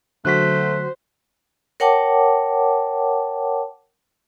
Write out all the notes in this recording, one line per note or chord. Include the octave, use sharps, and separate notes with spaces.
D3 F#3 A3 F#4 C5 F#6 B6
A#4 C#5 F#5 G5 A5 D6